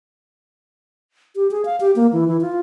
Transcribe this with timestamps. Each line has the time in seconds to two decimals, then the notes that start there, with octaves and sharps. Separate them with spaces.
1.36 G4
1.51 G#4
1.65 F5
1.80 G4
1.96 A#3
2.13 E3
2.28 E3
2.41 F4